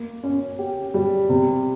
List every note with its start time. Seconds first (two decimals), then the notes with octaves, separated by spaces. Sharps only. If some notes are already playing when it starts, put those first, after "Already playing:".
Already playing: A#3
0.23 C#4
0.59 G4
0.94 G3
1.29 C3